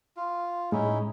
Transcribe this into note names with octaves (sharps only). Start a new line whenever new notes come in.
F4
A2 G#3 C#4 D#4 E4